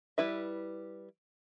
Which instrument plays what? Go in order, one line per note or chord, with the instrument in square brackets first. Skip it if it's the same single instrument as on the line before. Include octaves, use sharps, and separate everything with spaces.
[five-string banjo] G3 E4 B4 E5